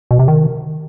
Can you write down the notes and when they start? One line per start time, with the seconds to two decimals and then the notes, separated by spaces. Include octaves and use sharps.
0.11 B2
0.19 C3
0.28 D#3